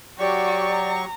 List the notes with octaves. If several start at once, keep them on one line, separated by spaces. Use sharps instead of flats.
F#3 F#4 G4 D5 C#6
A#5